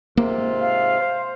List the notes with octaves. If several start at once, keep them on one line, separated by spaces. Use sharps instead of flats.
G#2 C3 A#3 F4
F5
C5